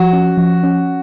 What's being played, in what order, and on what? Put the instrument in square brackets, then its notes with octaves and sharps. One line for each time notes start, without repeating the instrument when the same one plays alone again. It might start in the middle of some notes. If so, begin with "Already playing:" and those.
Already playing: [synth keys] F3 [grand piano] F#4
[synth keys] C#4
F3
C#4